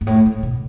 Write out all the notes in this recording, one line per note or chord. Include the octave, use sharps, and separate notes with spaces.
G2
A2
A2
B2